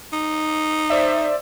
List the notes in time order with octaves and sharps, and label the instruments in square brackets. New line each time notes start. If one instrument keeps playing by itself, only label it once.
[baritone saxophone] D#4
[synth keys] C5 D5 E5